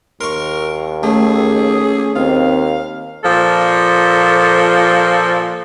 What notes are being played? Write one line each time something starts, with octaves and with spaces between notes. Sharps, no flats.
D#2 A#4 C6 C#6
A3 C#4 G#4
D#2 C4 F5
A#2 F3 A4